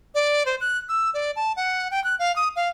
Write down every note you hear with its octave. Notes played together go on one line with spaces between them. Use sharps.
D5
C5
F#6
E6
D5
A5
F#5
G5
F#6
F5
D#6
F5